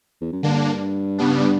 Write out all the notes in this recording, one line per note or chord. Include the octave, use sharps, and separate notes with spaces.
E2
F#2
G2 D3 A#3 D4
C#3 G3 B3 D4